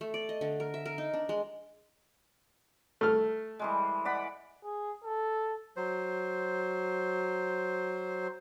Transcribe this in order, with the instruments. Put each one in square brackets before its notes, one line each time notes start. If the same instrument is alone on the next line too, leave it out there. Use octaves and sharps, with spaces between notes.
[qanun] A3
D5
D#5
D3
A#4
E5
A#4
D#4
D4
G#3
[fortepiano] A3 F6
[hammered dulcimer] E3 G3 G#3
D5 F#5 B5
[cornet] G#4
A4
[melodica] F#3 C5